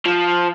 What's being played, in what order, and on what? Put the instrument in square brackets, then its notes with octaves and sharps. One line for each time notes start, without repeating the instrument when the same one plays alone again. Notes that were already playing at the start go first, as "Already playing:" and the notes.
[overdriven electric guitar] F3